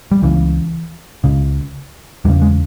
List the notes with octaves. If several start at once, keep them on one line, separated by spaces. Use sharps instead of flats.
G3
C#2 C#3 E3
C#2 C#3
E2 C#3 G3
G#3